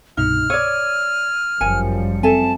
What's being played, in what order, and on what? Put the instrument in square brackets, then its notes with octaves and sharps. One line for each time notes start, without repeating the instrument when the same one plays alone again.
[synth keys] C2 G2 B2 [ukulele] D#4 [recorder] F6
[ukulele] C#5 D5 [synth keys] E6 G#6 D#7
[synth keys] G1 C#7 [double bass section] F#2 F3 G3 [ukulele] A#4 G#5
[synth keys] C4 [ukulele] A4 E5 G#5 [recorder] A5